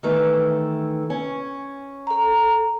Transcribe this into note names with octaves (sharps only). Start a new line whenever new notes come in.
D#3 E3 A3
C#4
A4 A#5